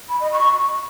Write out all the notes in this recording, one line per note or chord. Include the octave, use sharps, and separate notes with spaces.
B5
D#5
C#6